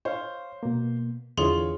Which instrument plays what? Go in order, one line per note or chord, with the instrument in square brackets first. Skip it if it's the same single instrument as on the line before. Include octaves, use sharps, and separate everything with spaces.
[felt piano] C5 [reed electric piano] C#5 F5
[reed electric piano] B2 A#3
[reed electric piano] E2 D3 E3 [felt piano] F4 C#5 [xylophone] G#4 C6